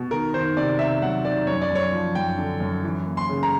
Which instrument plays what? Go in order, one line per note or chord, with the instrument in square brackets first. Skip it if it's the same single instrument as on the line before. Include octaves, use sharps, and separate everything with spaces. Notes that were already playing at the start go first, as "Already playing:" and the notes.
Already playing: [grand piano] B2
D#3 A#4
D#3 C5
C3 D5
C3 E5
F#3 F#5
D#3 D5
F#2 C#5
D5
F#2 C#5
F3
F#2 G5
D3
F#2
E3
A#3
C6
C#3
A#5